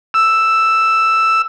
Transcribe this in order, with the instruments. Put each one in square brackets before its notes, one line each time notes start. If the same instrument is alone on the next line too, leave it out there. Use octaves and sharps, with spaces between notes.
[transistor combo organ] E6